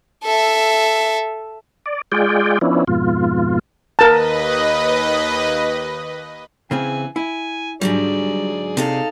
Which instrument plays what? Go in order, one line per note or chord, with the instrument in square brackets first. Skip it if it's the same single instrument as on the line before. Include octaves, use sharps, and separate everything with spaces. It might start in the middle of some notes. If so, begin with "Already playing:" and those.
[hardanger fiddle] A4 E5
[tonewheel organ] D5
G#3 F4 G#4 D5 G5
F3 B3 C#4 D4 E4
F2 G#2 B2 F4
[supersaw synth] D#2 B4 D#5 [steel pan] A#4 A5
[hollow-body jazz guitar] C#3 C4 G#4 [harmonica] E3 G#5
[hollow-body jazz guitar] E4 [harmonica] G#5
[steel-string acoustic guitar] G#2 D3 F#3 [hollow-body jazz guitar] G3 [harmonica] G#4 D5
[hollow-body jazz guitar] C3 [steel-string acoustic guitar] D#4 A4 F5